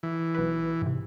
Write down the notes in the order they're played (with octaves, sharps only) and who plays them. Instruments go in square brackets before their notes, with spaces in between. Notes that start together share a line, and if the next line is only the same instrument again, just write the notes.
[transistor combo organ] E3
[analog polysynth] B1 B4
G#2 C3